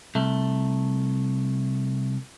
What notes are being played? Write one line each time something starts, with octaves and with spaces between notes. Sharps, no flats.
C2 A3